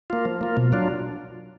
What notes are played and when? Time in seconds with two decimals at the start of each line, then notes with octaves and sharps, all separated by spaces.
0.10 A#3 F4
0.25 F3
0.41 A#3 F4
0.57 B2
0.72 F#3 D4 F4